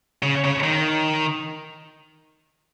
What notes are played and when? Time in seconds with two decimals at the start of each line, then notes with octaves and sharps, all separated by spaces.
0.23 C#3
0.45 C#3
0.64 D#3